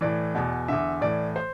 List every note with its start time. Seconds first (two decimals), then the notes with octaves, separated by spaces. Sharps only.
0.01 A2 E3 D5
0.35 E2 B2
0.68 E2 D3 E5
1.01 A2 E3 D5
1.36 C5